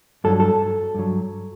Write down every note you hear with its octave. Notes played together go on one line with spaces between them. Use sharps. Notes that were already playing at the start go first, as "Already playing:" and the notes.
G2 F#3 A4
A4
G2 F#3